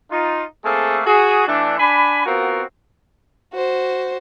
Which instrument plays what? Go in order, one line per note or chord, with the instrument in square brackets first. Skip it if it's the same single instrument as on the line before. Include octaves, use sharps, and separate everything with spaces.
[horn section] D#4 F4
A3 A#3 C4 G#4 A4
F#4 G#4
E3 A3 D4
D4 G#5 B5
B3 C4 F4 F#4 A#4
[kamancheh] F#4 C5